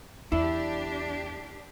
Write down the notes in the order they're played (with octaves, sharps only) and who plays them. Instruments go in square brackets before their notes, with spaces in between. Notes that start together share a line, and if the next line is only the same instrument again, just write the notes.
[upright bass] E2 [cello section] D4 G4 [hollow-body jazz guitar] E4